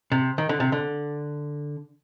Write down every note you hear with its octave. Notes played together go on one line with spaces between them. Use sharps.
C3
D#3
D3
C3
D3